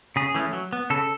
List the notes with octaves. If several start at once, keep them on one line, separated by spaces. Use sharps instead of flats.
C#3 G#4
E3 A3 C#4
F#3
B3
C#3 A4